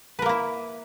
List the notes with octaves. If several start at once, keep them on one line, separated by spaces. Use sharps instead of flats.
A#3 E4 A#4 B4